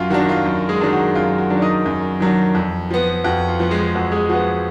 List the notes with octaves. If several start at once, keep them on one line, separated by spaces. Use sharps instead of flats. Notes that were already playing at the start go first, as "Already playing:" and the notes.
Already playing: F#2 F4 F#4
D#3 F#3 D4 F#4
F4
F#2
G#3 G#4
D#3 F#3 D4
F#4
F#2 F4
F#4
D#3 F#3 D4
D5
D#4 D#5
F#2
D#3 F#3 D4
F2
F3 B3
F2 F#4
F4
F3 B3
G#3 G#4
F2 F#4
G#3 G#4
F3 B3 F#4